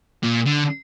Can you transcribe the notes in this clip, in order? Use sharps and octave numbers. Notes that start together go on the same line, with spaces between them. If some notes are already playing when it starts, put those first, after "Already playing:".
A#2
D3